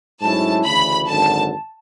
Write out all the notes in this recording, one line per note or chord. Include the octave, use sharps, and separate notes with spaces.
G#2 F#3 A3 C#4 E4 A5
D2 C#3 E3 B5
G#1 F#2 D3 A5